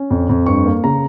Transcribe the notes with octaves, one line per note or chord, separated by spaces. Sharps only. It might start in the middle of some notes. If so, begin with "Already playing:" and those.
Already playing: C#4
F2
F2
G2 C#6
A#3
C#3 A#5